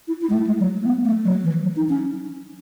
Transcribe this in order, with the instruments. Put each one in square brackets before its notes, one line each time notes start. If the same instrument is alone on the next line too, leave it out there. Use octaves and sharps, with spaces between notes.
[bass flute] E4
E4
G#3
A3
G#3
F#3
A3
B3
A3
F#3
E3
F#3
D#4
C#4